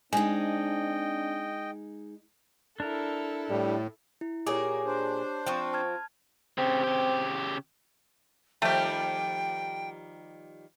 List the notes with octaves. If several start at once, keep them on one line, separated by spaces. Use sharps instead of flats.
G#3 C4 D4 D#4 D#5 G5 G#5
D4 E4 A4 A#4
A2 G3
E4
A#2 A#3 G4 G#4 C#5 D6
D4 C5
F3 C4 G5 C#6
A5 F6 G#6
C#3 C4 G4
C#3 G4
D#3 F3 G3 A3 G4 G5